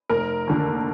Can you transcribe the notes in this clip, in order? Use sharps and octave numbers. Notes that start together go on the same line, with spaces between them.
F1 A#4
D#2 D3